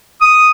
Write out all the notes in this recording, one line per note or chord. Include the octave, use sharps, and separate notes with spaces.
D#6